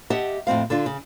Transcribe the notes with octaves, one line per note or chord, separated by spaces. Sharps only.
G4 D#5 E5 F#5 A5
F2 A2 C4 F5
D3 D4 F4
C#3